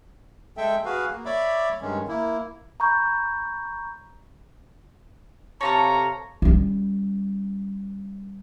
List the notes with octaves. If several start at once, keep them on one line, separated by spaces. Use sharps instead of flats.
G#3 A4 E5 G5
F#4 G#4 B4 F5
A#3
C#5 D5 E5 B5 D6
G2 D#3 G#3 C#4
A#3 E4
A#5 B5 C#6 G6
C3 A4 C#5 F5 A5 A#5
G3 C#4